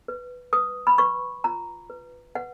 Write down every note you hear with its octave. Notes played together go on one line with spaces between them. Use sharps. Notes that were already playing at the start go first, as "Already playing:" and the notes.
B4
B4 D#6
B5
B4 C#6
F4 A#5
B4
B4 F#5